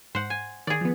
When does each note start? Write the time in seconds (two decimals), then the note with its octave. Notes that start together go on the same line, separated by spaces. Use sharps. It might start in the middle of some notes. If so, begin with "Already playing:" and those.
0.15 G#2 C5 F#5
0.30 G#5
0.67 D#3 G#4 D5
0.81 F3 B3